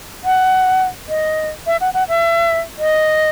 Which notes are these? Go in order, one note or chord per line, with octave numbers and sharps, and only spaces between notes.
F#5
D#5
E5
F#5
F#5
E5
D#5